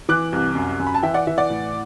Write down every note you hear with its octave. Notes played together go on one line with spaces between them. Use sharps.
E3 D6 F#6
C2
F#2
F#2
B5
A5
E3 E5 G5
D5 F#5
E3 E5
D5 F#5
A2